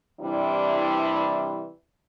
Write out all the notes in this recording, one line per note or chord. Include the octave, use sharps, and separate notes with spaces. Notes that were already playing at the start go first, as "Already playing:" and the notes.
C3 E3 G3 D4 E4